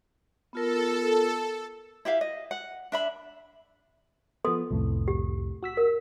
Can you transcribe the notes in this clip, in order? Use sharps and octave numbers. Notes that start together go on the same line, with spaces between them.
B3 F4 A4 A#4
E4 G4 E5 F5
D#5
F#5
D4 E5 B5
F3 B3 A4 C6 D#6
C2 F2 A2
G4
F#4 E6 B6
A#4